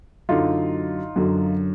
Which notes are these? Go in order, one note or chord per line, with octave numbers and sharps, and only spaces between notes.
F#2 D3 F#3 D#4 F4
F#2 D3 F#3